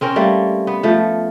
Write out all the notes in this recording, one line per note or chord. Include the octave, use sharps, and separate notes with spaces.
C4 C#4 A#4
G3 A3 A#3
B3
F3 A3